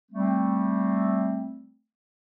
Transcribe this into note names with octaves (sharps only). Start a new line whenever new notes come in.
G3 A3 C4